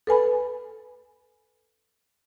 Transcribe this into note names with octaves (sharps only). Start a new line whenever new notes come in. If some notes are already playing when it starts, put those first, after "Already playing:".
A4 B4 G#5 B5